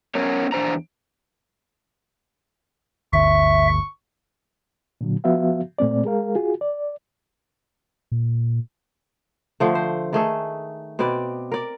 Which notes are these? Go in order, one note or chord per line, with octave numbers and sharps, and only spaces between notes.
B3 C#4 A#4 C#5
E2 D4 C5 A#5
G1 D2 E5 C#6
A#2 D3 F#3
F3 B3 F#4 E5 F5
A#2 A3 C4 D5
G#3 G#4 A#4 F5
F4 F#4 G#4
D5
A#2
D3 F3 A3
C5
D#3 A3 G#4 A4
B2 C4 B4 D5
A#4 D5